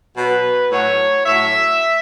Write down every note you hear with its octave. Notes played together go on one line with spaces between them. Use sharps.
B2 F#3 B4
A2 F#3 C#5
A2 F#3 E5